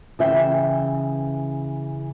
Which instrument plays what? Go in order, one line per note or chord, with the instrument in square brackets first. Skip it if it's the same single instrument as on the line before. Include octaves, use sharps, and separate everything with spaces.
[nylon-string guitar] C#3 E3 E5 G5